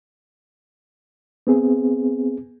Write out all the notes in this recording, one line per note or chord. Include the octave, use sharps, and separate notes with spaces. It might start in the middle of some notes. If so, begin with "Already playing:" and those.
B3 C4 G#4